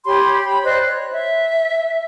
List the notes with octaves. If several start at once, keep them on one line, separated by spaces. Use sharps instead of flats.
G4 C#5 B5 C6
B5
C5 D5 D#5 F#6
C#5
E5